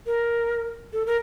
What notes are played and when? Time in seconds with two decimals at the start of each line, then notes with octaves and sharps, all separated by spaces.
0.06 A#4
0.93 A4
1.07 A#4